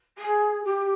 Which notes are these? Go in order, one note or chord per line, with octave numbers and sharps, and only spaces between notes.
G#4
G4